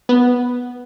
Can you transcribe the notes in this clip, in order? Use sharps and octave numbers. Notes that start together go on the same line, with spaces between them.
B3